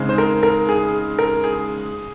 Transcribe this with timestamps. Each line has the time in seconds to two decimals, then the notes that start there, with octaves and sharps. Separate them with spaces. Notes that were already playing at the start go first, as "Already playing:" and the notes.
Already playing: C#3 G#3 C4 D#4
0.09 C5
0.18 A#4
0.43 A#4
0.69 G#4
1.19 A#4
1.44 G#4